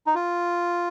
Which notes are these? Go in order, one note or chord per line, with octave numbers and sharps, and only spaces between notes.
D#4
F4